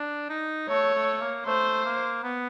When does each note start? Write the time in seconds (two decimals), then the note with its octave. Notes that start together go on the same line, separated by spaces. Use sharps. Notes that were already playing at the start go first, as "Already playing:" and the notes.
Already playing: D4
0.29 D#4
0.69 A3 C#5
0.95 A3
1.21 A#3
1.46 A3 C5
1.85 A#3
2.23 B3